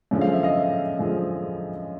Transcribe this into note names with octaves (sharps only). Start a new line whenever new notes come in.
F#2 D3 F3 G#3
F5
E5
D#5 F5
F#2 D3 F3 G#3